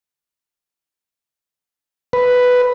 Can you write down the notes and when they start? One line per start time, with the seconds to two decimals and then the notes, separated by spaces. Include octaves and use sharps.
2.13 B4